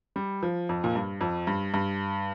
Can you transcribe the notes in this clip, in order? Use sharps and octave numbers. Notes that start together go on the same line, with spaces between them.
G3
F3
F2
A#2
G2
F2
G2
G2